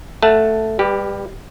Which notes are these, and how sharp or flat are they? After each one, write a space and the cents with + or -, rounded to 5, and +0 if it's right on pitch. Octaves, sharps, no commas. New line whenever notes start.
A3 +0 F#5 +0 A5 +0
G3 +25 G4 -5 B4 +0